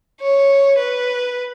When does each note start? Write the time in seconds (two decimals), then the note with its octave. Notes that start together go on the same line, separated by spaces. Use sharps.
0.21 C#5
0.78 B4